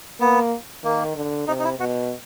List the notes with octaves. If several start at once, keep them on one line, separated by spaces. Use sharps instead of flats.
A#3 B3
D#3 A#3
D3
C3 D#4
D#4
E4
B2 F#4